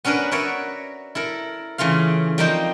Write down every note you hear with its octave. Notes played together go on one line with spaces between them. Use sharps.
B3 C#4 D4 A#4 B4
F#4 A#4 B4 C#5 D5 E5
E4 A4 A#4
C#3 E3 A3 F4 F5
F3 G3 A#3 C4 D#4 C5